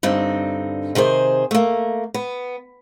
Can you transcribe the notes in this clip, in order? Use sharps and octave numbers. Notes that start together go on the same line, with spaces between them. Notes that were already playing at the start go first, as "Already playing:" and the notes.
G2 D3 C4 D#4
C3 D#3 G#4 C5
A3 A#3
B3